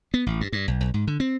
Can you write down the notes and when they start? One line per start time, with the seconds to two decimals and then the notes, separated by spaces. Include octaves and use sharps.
0.14 B3
0.26 A1
0.41 G2
0.52 G2
0.68 B1
0.81 B1
0.94 G#2
1.07 D3
1.20 C4